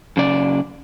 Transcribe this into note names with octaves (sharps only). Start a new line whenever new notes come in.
F#2 C#3 D5